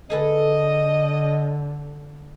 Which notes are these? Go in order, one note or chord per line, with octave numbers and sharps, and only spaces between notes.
D3 G#4 A4 B4 D#5